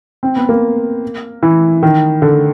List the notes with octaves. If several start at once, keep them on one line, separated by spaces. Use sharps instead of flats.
C4
B3
A#3
E3
D#3
D3